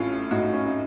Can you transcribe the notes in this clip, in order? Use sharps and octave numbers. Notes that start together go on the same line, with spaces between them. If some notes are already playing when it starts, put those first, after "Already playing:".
Already playing: A1 A2 C#4 F4
A2 D#4 F#4
C#4
D#4